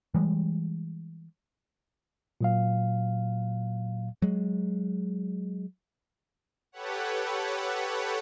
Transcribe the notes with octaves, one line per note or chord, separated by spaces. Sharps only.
E3 G3 G#3
A#2 F#3 F5
F#3 G#3
G4 A4 B4 C#5 F#5